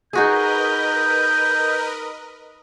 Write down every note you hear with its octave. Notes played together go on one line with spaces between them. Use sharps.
D#4 F#4 G#4 A#4 B4 D#5 G6